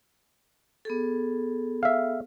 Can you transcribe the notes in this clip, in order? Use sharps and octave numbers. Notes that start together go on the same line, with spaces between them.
B3 G#4 A4
E5 F5